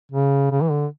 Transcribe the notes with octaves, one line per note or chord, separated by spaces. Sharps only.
C#3
C#3
E3
D3